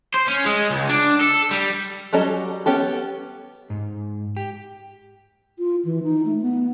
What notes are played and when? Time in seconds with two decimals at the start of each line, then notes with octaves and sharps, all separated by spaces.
0.14 C5
0.28 C#4
0.46 G#3
0.70 C#2
0.89 D4
1.21 A4
1.51 G3
2.13 F#3 G3 C#4 A4 D#5
2.66 B3 C#4 G4 A4
3.70 G#2
4.37 G4
5.59 F4
5.85 E3
6.03 D#4
6.26 A3
6.42 B3